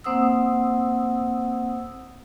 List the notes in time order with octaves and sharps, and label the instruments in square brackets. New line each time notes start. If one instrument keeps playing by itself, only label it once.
[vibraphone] A#3 C4 C5 F#5 D#6 E6